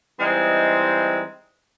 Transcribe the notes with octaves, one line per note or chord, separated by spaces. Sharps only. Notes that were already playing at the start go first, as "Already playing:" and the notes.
E3 G3 G#3 C4 D#4